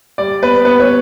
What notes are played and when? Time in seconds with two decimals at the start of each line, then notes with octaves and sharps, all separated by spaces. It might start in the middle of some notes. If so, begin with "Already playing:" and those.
0.18 G3 D5
0.42 B3 B4
0.65 B3 B4
0.80 C#5